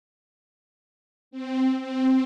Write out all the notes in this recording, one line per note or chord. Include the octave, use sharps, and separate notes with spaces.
C4
C4